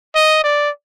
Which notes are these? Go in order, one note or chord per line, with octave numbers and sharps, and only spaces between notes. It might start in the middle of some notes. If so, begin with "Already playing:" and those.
D#5
D5